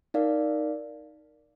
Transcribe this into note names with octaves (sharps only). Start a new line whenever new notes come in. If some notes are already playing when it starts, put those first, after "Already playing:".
D#4 A#4 D5 F5